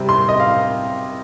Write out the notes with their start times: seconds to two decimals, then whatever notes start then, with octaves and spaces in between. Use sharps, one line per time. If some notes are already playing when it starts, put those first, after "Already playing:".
Already playing: C3 G3 C4
0.09 C6
0.29 D#5
0.40 F5